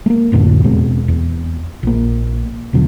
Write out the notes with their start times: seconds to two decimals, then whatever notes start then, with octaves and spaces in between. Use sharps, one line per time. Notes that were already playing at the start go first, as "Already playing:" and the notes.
0.06 A3 A#3
0.32 C2 F2 A2 D3
0.64 E2 B2 G#3 C4
1.08 E2
1.83 A#1 A#3
2.73 D#2 B2 D3 F#3